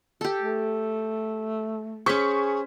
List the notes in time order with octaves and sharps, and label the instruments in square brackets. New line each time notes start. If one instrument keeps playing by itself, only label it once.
[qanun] G4 A4
[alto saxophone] A3
[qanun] C#4 C5 [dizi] G#4 [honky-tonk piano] C#6 B6